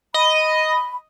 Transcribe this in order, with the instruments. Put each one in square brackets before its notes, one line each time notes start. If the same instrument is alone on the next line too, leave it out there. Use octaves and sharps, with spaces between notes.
[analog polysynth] D#5 [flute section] B5